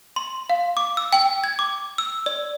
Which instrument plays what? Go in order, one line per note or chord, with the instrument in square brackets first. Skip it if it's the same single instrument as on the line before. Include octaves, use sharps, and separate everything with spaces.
[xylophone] C6
F5
D6
E6
G5
G#6
D6
E6
D5